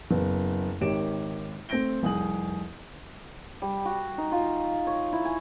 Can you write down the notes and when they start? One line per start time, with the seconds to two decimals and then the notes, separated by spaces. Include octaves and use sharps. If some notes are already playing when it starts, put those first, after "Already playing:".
0.11 F#1 B3
0.81 G#1 D#3 G4 C#5 D7 E7
1.69 A3 C4 G6 A#6 D7 G7
2.02 F1 C2 G#4 D#6 F#7
3.62 G3
3.85 F#4
4.18 D#4
4.32 F4
4.87 C#5
5.13 E4
5.25 G#5